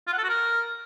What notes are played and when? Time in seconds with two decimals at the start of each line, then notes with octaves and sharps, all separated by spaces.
0.07 F4
0.13 F#5
0.18 A4
0.24 F#4
0.29 A#4